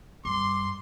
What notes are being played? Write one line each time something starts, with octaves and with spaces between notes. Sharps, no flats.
G2 C6 D6